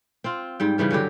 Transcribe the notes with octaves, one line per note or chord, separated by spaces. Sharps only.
C4 F4
G#2 G3 G5
C#3 E3 G3 C#4
G2 D3 F#3 G4